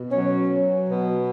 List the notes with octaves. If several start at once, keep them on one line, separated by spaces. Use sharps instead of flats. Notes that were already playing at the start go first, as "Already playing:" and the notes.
Already playing: B2
F#3 C#4
F#3
B2